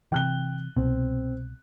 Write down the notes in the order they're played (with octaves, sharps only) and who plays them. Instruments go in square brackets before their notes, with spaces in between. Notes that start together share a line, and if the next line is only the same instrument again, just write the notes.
[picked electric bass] C3 E3 [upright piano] G5 F#6 G7
[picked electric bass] C2 B2 [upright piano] C4